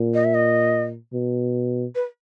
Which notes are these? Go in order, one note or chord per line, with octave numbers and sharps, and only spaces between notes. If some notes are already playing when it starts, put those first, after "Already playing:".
Already playing: A#2
D#5
E5
D#5
B2
B4